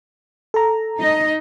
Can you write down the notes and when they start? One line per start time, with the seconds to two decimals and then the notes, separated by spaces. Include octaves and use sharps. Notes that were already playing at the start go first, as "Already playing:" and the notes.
0.54 A4 A#5
0.99 D#4 D#5